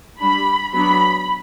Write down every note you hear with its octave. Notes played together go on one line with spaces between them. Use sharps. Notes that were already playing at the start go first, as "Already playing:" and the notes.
G3 D4 B5
F#3 B3 D4 B5